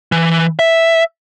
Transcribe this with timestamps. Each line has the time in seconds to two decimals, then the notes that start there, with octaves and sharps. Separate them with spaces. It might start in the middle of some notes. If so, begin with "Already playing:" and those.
0.12 E3
0.59 E5